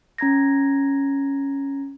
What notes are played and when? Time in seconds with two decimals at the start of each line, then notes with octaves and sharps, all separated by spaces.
0.18 C#4 A#5 G#6 A#6